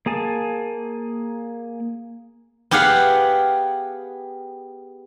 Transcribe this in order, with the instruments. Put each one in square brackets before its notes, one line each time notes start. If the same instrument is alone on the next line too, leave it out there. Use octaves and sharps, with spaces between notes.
[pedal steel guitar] A#3 G#4 G#5 A5
[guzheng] B3 G4 G#4 F5 F#5